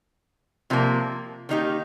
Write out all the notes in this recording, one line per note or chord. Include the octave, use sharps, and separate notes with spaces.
C3 F3 A#3
D#3 A#3 D#4 G4